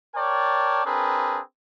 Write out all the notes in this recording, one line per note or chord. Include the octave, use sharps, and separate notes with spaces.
A#4 C#5 D5 G5 A5
C4 D4 G#4 A#4 B4